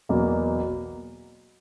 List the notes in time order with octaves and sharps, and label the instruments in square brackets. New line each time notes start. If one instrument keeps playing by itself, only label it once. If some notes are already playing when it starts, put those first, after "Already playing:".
[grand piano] E2 B2 F#3 A#3